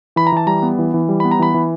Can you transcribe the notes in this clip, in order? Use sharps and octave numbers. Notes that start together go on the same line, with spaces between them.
E3 B5
A#5
E3 A5
G3 A#5
B3
E3
E3
G3
B3 B5
A#5
E3 B5
E3